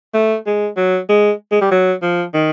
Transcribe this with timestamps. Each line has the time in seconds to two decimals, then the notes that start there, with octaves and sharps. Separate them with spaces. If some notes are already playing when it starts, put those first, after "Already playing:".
0.14 A3
0.46 G#3
0.77 F#3
1.09 G#3
1.51 G#3
1.61 G3
1.71 F#3
2.02 F3
2.34 D#3